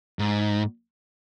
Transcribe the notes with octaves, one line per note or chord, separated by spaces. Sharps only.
G#2